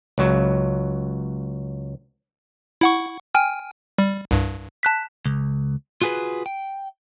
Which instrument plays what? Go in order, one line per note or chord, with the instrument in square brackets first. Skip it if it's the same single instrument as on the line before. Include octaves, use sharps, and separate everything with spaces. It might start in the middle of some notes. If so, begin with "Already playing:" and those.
[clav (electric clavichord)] C#2 F#3
[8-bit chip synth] E4 F#5 C#6
G5 G#5 F6
G3
C2 G2
A5 F#6 B6
[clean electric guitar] C#2
F4 F#4 G#4 A4 B4
G5